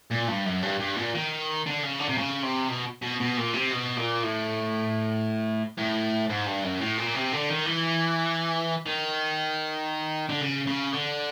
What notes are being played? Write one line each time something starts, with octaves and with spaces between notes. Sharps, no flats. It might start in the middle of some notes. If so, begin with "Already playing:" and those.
A#2
G2
F#2
G2
G2
A#2
D#3
D3
C#3
D3
C3
C#3
C3
B2
B2
B2
A#2
C3
B2
A#2
A2
A2
G#2
G2
F#2
A2
A#2
C3
D3
D#3
E3
D#3
D3
C#3
C#3
D3